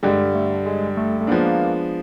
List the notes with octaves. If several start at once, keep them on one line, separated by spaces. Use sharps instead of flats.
G2 D3 G3 G#3
A3
G#3
A3
A3
F3 G#3 A#3 B3 D4